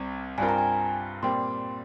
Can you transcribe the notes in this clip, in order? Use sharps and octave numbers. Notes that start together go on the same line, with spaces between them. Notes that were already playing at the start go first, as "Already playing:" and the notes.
Already playing: C2 C3 G3 C4
G2 G3 C4 F4 A#4 G#5
A#5
G#5
A#2 G3 C4 C6